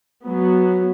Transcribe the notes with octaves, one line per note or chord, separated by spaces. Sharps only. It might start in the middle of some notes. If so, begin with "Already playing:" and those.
F#3 B3